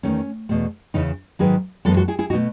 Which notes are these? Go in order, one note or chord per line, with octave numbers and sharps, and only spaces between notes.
E2 D#3 A3 C#4
E2 B2 A3
E2 C#3 E3 D#4
G#2 D#3 F#3 G#4 B4
F#2 E3 G#3 B3 F#4 A4
F#4 A4
E4 G#4
E4 G#4
D#4 F#4
B2 A3